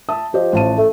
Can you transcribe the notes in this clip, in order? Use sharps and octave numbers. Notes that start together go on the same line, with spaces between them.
E5 A5 D#6
F3 G4 D#5
A1 A5 D#7
A3